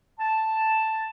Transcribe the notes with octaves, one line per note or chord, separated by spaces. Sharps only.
A5